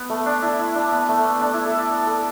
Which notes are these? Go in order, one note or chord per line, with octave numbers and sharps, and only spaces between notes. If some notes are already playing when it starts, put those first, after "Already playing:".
Already playing: B3
A3
D4
E4
E4
D4
B3
A3
B3
D4
E4
A4
D5
A4